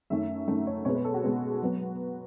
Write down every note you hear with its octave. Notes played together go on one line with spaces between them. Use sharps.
F#2 D#3 A3 C#4 E5
F#2 D#3 A3 C#4
C#5
B2 G#3 B3 C#5
B4
A4
F#4
B2 G#3 B3
F#3 B3